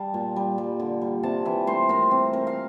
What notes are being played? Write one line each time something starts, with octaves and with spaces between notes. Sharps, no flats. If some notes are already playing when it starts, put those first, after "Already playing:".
Already playing: G3 F5 A5
A#2
G3
G3
D3
G3
C3 A5
E3 E5
A3 C5
C4 A#4
C4
C4 A#4
F5